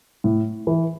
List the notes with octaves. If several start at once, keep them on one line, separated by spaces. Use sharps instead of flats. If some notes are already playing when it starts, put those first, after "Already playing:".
A2
E3